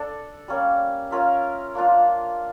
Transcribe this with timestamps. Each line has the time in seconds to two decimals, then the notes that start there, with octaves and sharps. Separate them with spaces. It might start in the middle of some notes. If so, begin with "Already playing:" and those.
Already playing: D4 A4 D5
0.48 G3 A#3 C#4
1.11 C#4 F4 A#4 E5
1.75 A#3 D4 F4